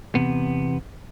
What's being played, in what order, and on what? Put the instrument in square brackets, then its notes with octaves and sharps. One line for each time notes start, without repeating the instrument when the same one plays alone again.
[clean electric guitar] E2 C3 B3